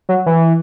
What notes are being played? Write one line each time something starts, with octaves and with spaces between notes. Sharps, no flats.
F#3
E3